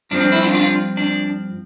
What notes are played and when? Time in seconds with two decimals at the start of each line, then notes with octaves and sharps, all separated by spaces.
0.11 G2 F3 C4 D4
0.21 D4
0.32 E4
0.43 D4 F4
0.55 D4 F4
0.97 D4